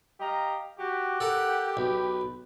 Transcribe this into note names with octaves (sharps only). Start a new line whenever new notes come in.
G4 D#5 F5 A#5
F#4 G4
A4 A#4 F#5
B1 B4